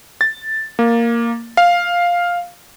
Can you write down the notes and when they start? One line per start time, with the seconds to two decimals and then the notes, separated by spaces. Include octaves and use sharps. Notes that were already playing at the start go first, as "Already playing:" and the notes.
0.21 A6
0.79 A#3
1.57 F5